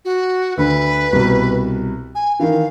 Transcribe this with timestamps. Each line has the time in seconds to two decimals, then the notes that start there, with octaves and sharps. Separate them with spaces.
0.05 F#4
0.57 D2 D3 B4
1.13 C2 B2
2.15 G#5
2.40 D#3 E3 F5